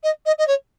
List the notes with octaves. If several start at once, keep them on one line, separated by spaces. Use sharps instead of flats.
D#5
D#5
D#5
C#5